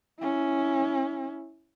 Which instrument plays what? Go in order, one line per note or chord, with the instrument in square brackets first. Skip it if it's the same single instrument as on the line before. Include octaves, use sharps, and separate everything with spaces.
[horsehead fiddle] C#4 E4